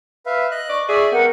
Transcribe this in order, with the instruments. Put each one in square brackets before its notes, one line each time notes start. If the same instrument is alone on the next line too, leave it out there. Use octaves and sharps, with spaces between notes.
[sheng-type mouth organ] B4 E5 F5
D#5 F#6
[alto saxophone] D5 [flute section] C#6
[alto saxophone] G#4 [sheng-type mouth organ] D5 E5
[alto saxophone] B3 [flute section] A#4 F#5 [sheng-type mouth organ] G5